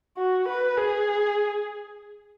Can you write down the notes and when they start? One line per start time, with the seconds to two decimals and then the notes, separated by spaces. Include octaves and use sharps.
0.17 F#4
0.48 B4
0.77 G#4